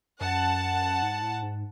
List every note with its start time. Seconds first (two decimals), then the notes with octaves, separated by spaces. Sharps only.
0.21 F#2 F#5 A5
1.02 G#2
1.22 A2
1.42 G#2